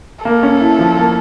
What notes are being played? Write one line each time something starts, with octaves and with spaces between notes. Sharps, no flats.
A#3 A4
C#4
E4
F3
A#3